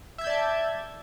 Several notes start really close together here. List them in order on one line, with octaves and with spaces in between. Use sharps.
E5 G#6 G6 D5 A5